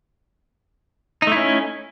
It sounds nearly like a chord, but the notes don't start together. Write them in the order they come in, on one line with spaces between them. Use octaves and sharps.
D#4 A3 E4 C#4